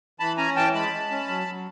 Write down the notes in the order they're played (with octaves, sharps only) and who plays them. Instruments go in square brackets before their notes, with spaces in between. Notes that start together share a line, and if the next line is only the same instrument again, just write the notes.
[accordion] E3 A5 B5
C#4 G#5 A#5
E3 G5 A5
G#3 A5 B5
G#3
C#4
F#3
F#3